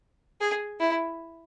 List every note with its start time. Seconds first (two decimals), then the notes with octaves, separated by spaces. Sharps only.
0.41 G#4
0.80 E4